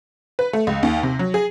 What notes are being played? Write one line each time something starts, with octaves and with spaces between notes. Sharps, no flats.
B4
A3
C#2
D#2
C3
F#3
G#4